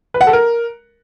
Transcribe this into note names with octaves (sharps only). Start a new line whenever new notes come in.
B4
F#5
A4
A#4